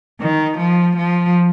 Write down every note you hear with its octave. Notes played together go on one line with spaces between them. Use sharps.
D#3
F3
F3